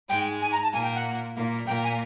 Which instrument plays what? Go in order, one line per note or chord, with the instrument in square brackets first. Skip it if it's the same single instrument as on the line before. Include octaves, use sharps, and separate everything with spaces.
[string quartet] G#2 G#3 [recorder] G5
[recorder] G#5
A#5
A5
[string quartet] A#2 A#3 [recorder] G#5
[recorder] G5
F#5
[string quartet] A#2 A#3
[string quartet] A#2 A#3 [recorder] G5
[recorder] G#5